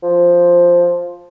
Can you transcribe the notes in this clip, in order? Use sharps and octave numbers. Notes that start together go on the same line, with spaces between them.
F3